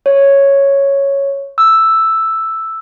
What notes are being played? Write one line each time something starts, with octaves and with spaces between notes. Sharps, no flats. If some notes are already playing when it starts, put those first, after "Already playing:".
C#5
E6